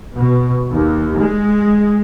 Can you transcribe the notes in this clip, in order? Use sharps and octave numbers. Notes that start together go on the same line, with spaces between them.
B2
D#2
G#3